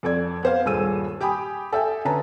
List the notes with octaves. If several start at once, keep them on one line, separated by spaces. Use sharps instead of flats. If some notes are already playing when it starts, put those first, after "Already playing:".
F2 A4 D5 G#6
B3 C5 F5
D#1 G2 G#4 A4 E6 D#7
G4 G5 G#5 B5 D#6
A4 E5 G5 G#5
D3 C#4 B4 A5 A#5